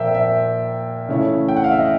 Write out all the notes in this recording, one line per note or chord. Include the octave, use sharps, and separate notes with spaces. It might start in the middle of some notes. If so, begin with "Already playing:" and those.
Already playing: A#2 F3 A#3 E5 G5
E5
C#3 E3 A3 C#4 E4
G5
F#5
F5
E5
D#5